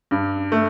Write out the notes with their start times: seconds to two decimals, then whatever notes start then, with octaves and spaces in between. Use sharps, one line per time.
0.11 G2
0.52 A3